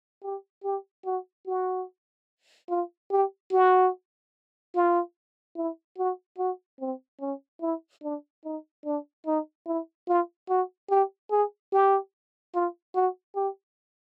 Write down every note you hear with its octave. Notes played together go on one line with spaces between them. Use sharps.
G4
G4
F#4
F#4
F4
G4
F#4
F4
E4
F#4
F#4
C4
C#4
E4
D4
D#4
D4
D#4
E4
F4
F#4
G4
G#4
G4
F4
F#4
G4